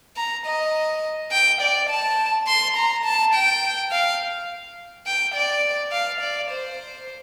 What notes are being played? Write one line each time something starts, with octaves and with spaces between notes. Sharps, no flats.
A#5
D#5
G5
D5
A5
C6
A#5
A5
G5
F5
G5
D5
F5
D5
C5